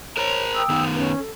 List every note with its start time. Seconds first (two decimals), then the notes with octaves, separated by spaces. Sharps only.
0.17 A#4 C5 C#5 A#5
0.55 G5 D#6 E6
0.69 D#3 B3 D#4
0.95 C#4 B4
1.18 A4